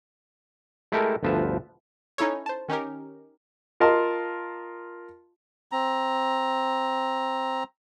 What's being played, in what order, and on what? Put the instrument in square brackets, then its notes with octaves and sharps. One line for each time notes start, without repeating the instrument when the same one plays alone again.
[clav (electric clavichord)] G#3 A3 E4 G4 A4 A#4
G1 D2 F3 B4 E5 A5
[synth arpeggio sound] C#4 D#4 E4 A4 C#5
C5 A5
D#3 C#4 D#4 G4 A#4
[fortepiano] F4 A#4 D#5 A5 C6
[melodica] C4 A#5